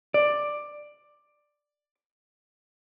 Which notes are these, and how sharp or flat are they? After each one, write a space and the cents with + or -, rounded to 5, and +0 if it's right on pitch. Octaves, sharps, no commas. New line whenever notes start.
D5 +10